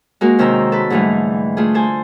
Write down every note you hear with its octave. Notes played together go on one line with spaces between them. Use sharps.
G#3 A#3 F#4 A#4
C3 D#3 C#4 C5 A#5 E6
A4 B4
G#2 D3 E3 G3 A3
A3 F4 G#4
A4 C5 G#5